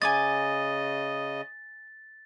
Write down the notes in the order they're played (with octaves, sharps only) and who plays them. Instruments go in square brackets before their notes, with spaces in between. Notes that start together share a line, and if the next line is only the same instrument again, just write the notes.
[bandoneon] C#3 D#5 [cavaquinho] G#5 D6 D#6 [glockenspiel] A6